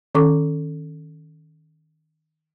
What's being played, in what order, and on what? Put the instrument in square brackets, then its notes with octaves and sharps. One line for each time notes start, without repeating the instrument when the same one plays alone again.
[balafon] D#3 C#4 A4 C#6 D6